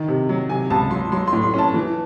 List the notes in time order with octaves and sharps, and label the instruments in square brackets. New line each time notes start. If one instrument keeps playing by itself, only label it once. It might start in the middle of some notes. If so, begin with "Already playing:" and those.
Already playing: [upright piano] D#3
C3
F#3
C3 G#5
C#2 A5
F#3 C6
F#3 C6
C6
A2
C6
C#4 A5
E3